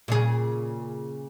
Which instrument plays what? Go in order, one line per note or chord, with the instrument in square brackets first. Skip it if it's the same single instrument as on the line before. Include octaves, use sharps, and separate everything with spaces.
[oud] A#2 C#3 G#4